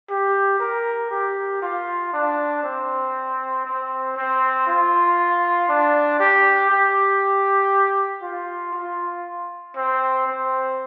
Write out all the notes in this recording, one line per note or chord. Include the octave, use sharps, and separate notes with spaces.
G4
A#4
G4
F4
D4
C4
C4
C4
F4
D4
G4
G4
F4
F4
C4
C4